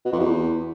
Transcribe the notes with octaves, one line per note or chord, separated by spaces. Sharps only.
B2
F2
E2